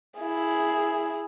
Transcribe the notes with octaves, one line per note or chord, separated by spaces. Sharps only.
E4 G#4